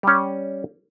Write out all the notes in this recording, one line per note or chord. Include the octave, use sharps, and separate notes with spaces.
G3 C#4